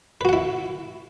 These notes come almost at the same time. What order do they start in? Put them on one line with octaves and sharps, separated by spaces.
B4 F#4 F#5 E4